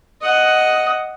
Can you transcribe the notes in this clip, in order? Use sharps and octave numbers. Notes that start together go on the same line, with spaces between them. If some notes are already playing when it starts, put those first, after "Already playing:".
D#5 F#5